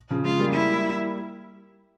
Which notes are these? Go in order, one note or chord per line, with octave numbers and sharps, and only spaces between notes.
C#3 F3
F3 G#3 F4
G3 A#3
E4